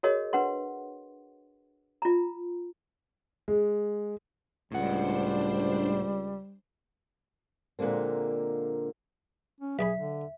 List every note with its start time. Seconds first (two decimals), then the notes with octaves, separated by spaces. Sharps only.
0.03 F#4 G#4 A#4 C#5 D#5
0.33 D4 B4 F#5 C6
2.02 F4 A#5
3.48 G#3
4.72 C#2 A2 G3 D4 C5 F#5
7.79 A#2 D3 G#3 A#3 C4
9.60 C#4
9.79 B1 G#4 D5 E5 B5
9.97 D3